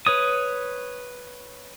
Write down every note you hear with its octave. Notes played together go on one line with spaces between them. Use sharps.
B4 C#5 D#6